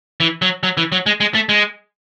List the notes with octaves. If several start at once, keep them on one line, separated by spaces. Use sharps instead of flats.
E3
F#3
F#3
E3
F#3
G#3
G#3
A3
G#3